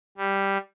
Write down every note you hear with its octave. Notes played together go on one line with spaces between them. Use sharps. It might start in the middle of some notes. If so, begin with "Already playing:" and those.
G3